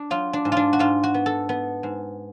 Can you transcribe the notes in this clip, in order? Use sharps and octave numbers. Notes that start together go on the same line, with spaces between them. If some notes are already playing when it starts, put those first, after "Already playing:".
Already playing: D4
F#3 F4
D4
G#2
D4 F4
F#4
G#2 F4
F#4
B3
A4
B3
G#2